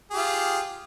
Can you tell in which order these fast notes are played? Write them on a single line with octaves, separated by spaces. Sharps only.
G#4 G4 F4